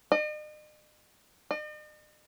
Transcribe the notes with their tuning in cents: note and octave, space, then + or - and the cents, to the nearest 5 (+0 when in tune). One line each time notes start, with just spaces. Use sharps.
D#5 -45
D#5 -45